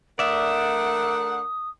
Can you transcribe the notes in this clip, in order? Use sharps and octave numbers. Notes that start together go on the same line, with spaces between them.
A3 D4 A#4 D5 E5 F#5 D#6